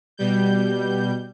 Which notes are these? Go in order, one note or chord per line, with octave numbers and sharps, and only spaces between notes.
B2 G3 G6